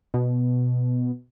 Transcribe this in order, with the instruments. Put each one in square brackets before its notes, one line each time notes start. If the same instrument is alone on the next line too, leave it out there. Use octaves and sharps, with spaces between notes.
[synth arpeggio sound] B2